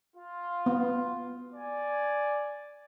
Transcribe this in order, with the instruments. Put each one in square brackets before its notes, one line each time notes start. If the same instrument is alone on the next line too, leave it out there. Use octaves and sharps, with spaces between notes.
[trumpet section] F4
[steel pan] B3
[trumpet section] D5 G#5